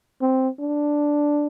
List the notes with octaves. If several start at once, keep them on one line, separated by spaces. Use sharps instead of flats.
C4
D4